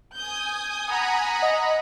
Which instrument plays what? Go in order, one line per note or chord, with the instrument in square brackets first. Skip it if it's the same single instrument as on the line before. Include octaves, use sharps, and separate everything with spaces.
[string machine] G#5 D#6 [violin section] G6
[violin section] F#5 A#5 B5
[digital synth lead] D#5